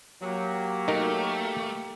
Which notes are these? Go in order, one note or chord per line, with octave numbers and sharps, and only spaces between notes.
F#3 A#3 G4
A3 D#4 A#4